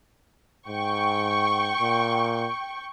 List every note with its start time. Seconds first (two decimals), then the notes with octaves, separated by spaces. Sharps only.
0.68 G#2 G5 C#6
1.80 A#2